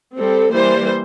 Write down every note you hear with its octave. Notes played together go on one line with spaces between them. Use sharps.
G3 C4 A4
E3 G3 A#3 C5